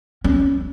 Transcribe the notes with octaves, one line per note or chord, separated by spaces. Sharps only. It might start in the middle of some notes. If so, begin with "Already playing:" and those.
C#4